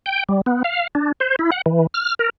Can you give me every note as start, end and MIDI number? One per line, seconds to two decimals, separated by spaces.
0.06 0.23 79
0.29 0.41 55
0.46 0.63 59
0.64 0.87 77
0.95 1.12 62
1.20 1.36 72
1.39 1.50 64
1.52 1.61 78
1.66 1.87 52
1.94 2.14 89
2.19 2.30 70